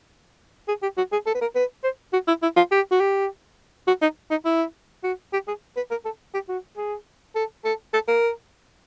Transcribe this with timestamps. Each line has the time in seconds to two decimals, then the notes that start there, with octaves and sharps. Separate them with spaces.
0.68 G#4
0.82 G4
0.97 F#4
1.12 G#4
1.26 A4
1.34 B4
1.41 A#4
1.55 B4
1.84 C5
2.13 F#4
2.27 E4
2.42 E4
2.56 F4
2.71 G4
2.91 F#4
3.00 G4
3.87 F#4
4.02 D#4
4.31 D#4
4.45 E4
5.03 F#4
5.33 G4
5.47 G#4
5.76 B4
5.90 A#4
6.05 A4
6.34 G4
6.48 F#4
6.77 G#4
7.35 A4
7.64 A4
7.93 A4
8.08 A#4